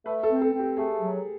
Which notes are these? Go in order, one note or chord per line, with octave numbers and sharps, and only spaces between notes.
A3 B4
A4
C4
A4
C4
G4
A3 G#4
F#3